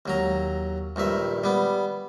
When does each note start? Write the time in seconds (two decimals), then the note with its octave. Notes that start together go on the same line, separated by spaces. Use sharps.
0.06 D#2 F#3 A#5
0.96 A#1 G2 D#3 E5
1.44 G3 B3